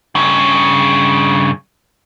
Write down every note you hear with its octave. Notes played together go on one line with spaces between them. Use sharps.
G2 C#3